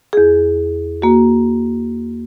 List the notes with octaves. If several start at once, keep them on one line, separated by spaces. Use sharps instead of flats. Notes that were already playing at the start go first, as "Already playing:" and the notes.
E2 G#4
A#3 F#4